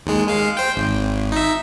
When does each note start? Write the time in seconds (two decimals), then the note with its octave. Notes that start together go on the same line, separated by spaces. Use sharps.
0.06 D#2 G#3
0.27 G#3 F5
0.57 C5 G5
0.77 G#1
1.32 D#4 E5